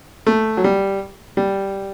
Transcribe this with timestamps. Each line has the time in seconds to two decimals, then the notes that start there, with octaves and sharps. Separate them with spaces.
0.27 A3
0.57 F#3
0.64 G3
1.37 G3